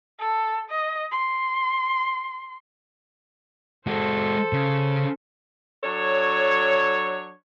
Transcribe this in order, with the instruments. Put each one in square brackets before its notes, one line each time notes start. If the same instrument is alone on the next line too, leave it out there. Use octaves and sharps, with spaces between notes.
[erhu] A4
D#5
C6
[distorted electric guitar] G#3 F#4 [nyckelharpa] A4 C5
[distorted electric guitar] C#3
[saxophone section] F#3 D4 A4 C#5